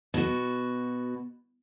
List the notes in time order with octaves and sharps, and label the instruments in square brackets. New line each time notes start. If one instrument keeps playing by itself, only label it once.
[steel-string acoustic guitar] B2 F#4